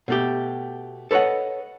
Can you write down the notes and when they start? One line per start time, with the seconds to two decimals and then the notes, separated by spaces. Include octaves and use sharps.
0.08 B2 A3 G4
1.11 A4 B4 C#5 D#5 F#5